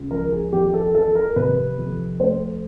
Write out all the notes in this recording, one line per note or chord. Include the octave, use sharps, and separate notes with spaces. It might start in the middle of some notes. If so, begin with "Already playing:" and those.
Already playing: C#2
F3 A#4
G#4
F2 G4
A4
F3 A4
A#4
C3 B4
F2
A3 C5